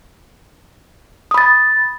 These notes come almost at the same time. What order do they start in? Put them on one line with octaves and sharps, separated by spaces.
D#6 B5 A6